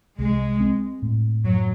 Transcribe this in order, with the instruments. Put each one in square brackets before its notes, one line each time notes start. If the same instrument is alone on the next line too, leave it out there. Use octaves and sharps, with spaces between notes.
[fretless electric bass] C2 [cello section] G#3
[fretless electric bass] C4
A2
[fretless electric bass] F#2 [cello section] F#3